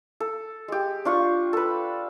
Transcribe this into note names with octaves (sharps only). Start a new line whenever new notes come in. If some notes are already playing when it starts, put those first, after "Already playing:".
A4
G#3 G4
D4 F4 C#6
A4 B4